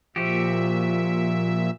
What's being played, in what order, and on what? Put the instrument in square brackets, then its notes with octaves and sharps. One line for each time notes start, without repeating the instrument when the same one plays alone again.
[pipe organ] A#2 E5 [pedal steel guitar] F3 F#4 G4